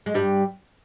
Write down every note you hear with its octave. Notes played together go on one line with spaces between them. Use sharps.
G#3
G2 G3